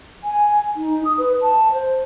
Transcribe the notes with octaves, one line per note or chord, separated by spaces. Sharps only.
G#5
D#4
D#6
B4
A5
C5